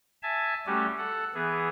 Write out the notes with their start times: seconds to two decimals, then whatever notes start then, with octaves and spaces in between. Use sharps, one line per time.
0.23 E5 G#5 A5
0.67 G3 A3 C#4 F#4 G4
0.98 A4 F#5
1.34 E3 B3 G#4